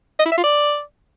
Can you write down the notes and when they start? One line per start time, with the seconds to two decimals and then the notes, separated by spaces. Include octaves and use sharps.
0.19 D#5
0.26 E4
0.32 E5
0.38 F4
0.44 D5